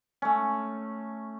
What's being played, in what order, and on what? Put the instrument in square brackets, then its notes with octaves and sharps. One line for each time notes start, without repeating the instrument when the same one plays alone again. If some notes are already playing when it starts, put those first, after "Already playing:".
[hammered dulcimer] A3 C#4